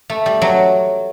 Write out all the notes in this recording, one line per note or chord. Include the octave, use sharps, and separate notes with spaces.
A3
G3
F#3